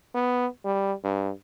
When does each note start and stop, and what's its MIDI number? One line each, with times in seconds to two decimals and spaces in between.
0.14 0.47 59
0.65 0.93 55
1.04 1.30 43